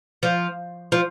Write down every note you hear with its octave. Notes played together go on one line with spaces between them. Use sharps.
F3
F3